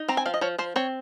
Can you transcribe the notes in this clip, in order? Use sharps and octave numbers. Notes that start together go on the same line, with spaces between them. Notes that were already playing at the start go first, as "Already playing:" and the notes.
Already playing: D#4
C4 A#5
G#5
F3 F5
D#5
F3 C#5
F3 C5
C4 C#5